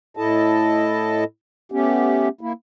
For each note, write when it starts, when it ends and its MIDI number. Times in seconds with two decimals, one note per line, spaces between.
0.17 1.24 45
0.17 1.24 64
0.17 1.24 69
0.17 1.24 75
0.17 1.24 81
1.72 2.29 57
1.72 2.29 59
1.72 2.29 61
1.72 2.29 67
2.41 2.53 58
2.41 2.53 64